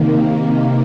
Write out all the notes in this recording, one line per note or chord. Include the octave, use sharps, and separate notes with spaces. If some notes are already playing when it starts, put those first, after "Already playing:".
Already playing: C3 D#3 A#3